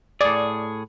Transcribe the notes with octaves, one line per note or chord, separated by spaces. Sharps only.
A2 G#4 D5